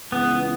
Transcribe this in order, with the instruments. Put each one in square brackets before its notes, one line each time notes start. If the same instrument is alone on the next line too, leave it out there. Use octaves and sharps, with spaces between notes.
[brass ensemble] C#2 C#3 E3 [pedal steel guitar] B3